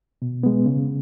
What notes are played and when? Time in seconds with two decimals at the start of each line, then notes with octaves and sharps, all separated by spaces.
0.22 B2
0.43 G#3 B3
0.66 C#3